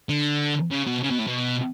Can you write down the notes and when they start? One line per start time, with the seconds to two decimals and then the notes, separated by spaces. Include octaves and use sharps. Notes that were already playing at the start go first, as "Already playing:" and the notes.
0.09 D3
0.71 C#3
0.87 B2
1.03 C#3
1.11 B2
1.19 A2
1.27 B2